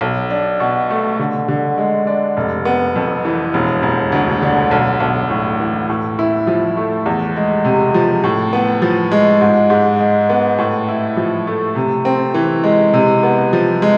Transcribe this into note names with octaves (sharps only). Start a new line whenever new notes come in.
B1
D4
B2
A3
D3
D3
G#3
D4
F1
B3
F2
E3
E1
E1
D2
D3
B1
B1
A2
E3
A2
E4
F3
A3
E2
G#3
C3
F3
A2
B3
F3
G#3
G#2
G#2
G#3
B3
A2
E4
F3
A3
C3
C4
E3
G#3
C3
B3
F3
G#3